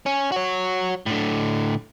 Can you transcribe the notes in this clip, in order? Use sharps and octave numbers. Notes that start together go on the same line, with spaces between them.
C#4
F#4 C#5
A2 D3